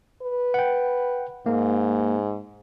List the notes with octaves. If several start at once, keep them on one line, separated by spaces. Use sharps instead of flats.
B4
F#5 G5
G#2 A#3